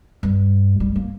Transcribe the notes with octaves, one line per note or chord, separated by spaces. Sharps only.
G2
G3
A#3